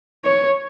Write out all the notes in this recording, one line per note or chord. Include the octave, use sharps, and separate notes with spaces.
C#5